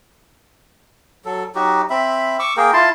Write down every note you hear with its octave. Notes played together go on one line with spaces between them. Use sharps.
F#3 A4
F#3 D#4 F#4 G4
C4 E5 B5
C#6 D6 E6
A#3 G#4 A#4 G5
E4 F4 A5 C6